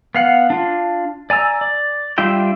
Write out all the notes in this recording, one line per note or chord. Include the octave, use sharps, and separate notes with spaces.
B3 F5 F#5
D4 F4
D5 G#5 A#5 E6
D5
G3 D4 F4 E5 G5